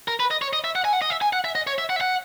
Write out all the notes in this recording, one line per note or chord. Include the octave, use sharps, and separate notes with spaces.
A#4
B4
D#5
C#5
D#5
E5
F#5
G#5
F#5
D#5
E5
G#5
F#5
E5
D#5
C#5
E5
F#5
E5
F#5